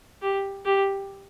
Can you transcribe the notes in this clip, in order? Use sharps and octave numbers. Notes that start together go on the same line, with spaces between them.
G4
G4